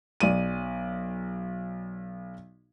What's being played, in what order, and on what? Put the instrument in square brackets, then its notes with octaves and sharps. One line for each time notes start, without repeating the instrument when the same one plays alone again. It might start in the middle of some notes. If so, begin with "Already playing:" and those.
[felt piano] B1 D5 D#7